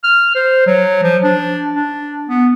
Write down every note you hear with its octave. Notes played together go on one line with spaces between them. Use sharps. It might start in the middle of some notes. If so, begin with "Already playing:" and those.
F6
C5
F#3
F3
D4
D4
B3